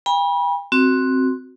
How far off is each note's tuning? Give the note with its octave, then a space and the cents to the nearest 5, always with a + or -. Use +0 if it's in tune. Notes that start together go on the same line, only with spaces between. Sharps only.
G5 +40 B5 -30
C4 +5 F#4 +0